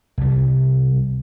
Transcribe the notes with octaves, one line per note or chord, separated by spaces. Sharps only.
C2 G3